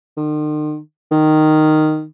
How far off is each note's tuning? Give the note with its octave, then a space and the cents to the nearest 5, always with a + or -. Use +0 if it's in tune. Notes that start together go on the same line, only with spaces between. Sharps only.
D#3 -45
D#3 -10